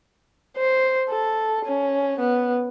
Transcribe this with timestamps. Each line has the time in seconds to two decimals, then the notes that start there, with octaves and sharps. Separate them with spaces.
0.57 C5
1.09 A4
1.65 C#4
2.20 B3